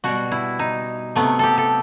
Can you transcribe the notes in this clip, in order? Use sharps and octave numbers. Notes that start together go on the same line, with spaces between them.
B2 G3 F#4
E4
D#4
C3 F#3 A3 B3
G4 A4
A4